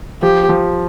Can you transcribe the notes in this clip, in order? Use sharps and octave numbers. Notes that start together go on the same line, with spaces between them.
F3 G4
F3